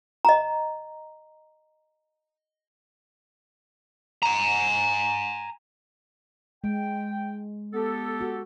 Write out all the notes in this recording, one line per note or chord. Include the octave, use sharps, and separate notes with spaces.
D#5 A#5
G#5 A#5
G#3 G5
B3 G4 A4
F#4